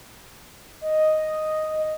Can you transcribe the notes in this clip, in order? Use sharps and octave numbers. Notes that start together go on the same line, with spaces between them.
D#5